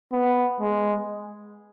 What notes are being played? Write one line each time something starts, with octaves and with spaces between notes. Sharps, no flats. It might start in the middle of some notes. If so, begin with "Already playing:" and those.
B3
G#3